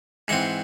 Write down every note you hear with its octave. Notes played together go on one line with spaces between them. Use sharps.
G#2 E3 C4 F#5